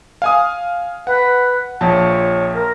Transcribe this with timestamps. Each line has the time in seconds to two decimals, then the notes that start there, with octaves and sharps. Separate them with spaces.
0.22 F5 G#5 D#6
1.07 B4 F#5
1.81 A#1 F3 C#5 A5
2.53 A#4